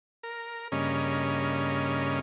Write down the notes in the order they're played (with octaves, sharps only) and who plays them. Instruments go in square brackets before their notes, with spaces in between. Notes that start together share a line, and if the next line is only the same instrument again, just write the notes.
[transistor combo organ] A#4
G2 C#3 A#3 C#4 D#5